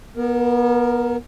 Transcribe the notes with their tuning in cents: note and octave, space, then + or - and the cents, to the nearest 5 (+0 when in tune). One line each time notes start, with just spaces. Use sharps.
B3 -30 A#4 +5